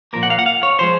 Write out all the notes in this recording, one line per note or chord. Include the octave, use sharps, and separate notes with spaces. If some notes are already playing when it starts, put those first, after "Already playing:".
A#2 F3 A#3 A#4
F#5
F5
F#5
F5
C#5
F3 G#3 C5